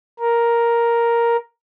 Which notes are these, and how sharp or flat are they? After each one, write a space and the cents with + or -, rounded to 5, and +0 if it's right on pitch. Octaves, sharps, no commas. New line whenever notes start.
A#4 +5